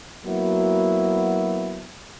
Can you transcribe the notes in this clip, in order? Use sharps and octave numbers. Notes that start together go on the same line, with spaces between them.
F#3 A#3 B3 E4 F#4